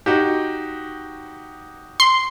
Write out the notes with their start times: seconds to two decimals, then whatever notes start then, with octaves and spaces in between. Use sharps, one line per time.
0.06 D#4 F#4 G4
2.00 C6